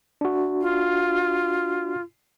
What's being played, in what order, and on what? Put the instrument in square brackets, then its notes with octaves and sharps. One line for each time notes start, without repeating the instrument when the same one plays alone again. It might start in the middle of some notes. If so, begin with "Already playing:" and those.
[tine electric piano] D4 F#4
[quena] F4